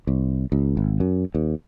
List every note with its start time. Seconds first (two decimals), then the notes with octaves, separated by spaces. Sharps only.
0.07 C2
0.52 C#2
0.77 G#1
1.00 F#2
1.35 D#2